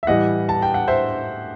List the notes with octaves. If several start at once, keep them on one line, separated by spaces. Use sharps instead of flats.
E5
A2 E3 G3 D#5 F#5
A5
G5
F#5
C5 E5